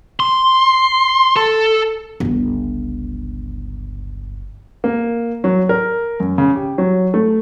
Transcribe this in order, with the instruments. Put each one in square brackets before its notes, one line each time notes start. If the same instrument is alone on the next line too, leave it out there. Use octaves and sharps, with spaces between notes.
[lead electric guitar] C6
A4
[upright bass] G1 C#2
[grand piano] A#3
F#3
A#4
F#2
C#3
G4
F#3
A3